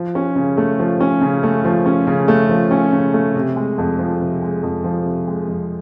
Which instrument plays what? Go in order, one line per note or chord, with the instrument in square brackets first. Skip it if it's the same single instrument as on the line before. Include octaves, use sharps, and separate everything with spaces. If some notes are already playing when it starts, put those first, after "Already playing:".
Already playing: [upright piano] F3
C#4
C#3
A3
F3
C#4
C#3
A3
F3
C#4
C#3
A3
F3
C#4
C#3
A3
C3
G#3
F2
F3
C3
G#3
F2
F3
C3
G#3
F2